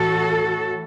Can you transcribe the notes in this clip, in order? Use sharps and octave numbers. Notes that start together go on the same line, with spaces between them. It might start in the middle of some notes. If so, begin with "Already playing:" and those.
Already playing: A2 E3 F#4 A4